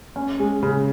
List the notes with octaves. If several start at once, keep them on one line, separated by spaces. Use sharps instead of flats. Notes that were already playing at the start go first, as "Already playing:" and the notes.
C#4
G#3
C#3